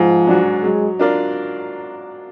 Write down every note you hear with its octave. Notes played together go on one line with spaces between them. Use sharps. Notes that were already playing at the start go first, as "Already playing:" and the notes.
Already playing: G#2 F3
F#3 D4 F#4
F#3 G#3
D4 F4 A#4 D5